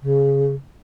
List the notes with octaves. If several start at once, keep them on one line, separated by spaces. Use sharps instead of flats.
C#3